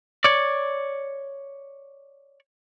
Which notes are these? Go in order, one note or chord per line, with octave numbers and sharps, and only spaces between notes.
C#5 D5